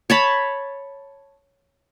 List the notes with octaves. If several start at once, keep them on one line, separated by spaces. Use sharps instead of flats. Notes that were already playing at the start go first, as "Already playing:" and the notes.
C#5 A5 B5